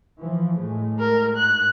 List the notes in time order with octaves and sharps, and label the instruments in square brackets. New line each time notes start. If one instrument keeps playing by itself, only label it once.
[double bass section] E3 F3
A2 G#3 A3
[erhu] A#4
[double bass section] G#2 [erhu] F#6